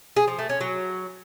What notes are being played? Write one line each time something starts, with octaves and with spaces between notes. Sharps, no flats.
G#4
F3
A3
C#4
F#3